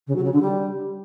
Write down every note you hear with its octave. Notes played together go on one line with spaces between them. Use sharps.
C#3
F#3
C#3
D3
G3